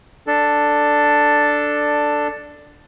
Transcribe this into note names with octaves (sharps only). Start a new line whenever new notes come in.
D4 A4